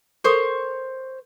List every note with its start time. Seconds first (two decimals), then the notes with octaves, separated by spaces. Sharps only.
0.24 A4 A#4 C5 C#5 C#6 D#6